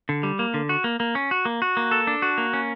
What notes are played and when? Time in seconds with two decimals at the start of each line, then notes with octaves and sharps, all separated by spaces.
0.09 D3
0.23 G3
0.39 A#3
0.54 D3
0.69 F#4
0.84 A#3
1.00 A#3
1.15 C#4
1.31 F#4
1.45 A#3
1.62 F#4
1.77 A#3
1.91 A4
2.07 D4
2.22 F#4
2.38 A#3
2.53 C#4